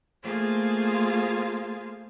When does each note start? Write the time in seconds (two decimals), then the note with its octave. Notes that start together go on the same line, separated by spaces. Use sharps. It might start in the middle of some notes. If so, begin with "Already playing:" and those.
0.22 A3 A#3 F4 G#4 C5 F5